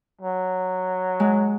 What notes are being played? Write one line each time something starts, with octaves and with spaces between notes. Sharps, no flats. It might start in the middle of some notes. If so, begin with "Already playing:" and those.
F#3
G#3